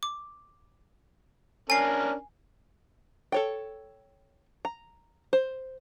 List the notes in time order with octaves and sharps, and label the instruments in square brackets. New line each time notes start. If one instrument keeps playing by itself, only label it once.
[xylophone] D6
[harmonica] C#4 D4 A#4 [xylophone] G#5 C7
[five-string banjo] A4 C#5 G5
A#5
C5